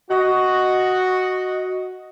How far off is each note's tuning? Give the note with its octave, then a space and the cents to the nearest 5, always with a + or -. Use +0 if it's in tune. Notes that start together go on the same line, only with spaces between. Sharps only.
F#4 +0 D#5 +0